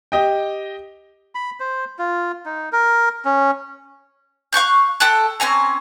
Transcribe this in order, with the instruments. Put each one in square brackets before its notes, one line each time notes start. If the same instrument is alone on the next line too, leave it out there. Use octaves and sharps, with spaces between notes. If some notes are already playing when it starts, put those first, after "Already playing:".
[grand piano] G4 D#5 G5
[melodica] B5
C5
F4
D#4
A#4
C#4
[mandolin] F5 C#6 F#6 G6
A4 G5 A5 F#6
C4 C#4 G#5 A#5